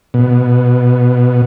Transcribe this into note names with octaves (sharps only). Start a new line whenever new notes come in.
B2